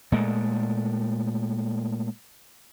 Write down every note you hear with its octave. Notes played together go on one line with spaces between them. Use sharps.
A#2 G#3 A3